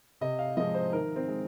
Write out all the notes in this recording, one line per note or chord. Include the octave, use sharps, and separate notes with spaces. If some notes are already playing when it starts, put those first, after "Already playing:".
C3 D#5
F5
F3 G#3 D#5
C5
D#3 A#4
C4
G#3